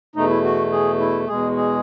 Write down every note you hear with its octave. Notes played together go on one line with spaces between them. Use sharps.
E2 B2 A3 D#4
E4
F#4
G#4
E4
E2 B2 G#3 G#4
G#4